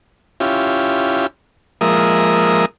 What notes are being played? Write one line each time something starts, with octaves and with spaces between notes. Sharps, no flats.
C#4 E4 F4 G4
F3 G#3 A#3 A#4 E5 D#6